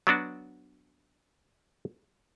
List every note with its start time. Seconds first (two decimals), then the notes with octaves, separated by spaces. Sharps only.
0.07 F#3 B3 D4 F#4